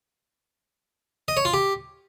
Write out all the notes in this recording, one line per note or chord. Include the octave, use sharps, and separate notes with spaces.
D#5
C#5
F4
G4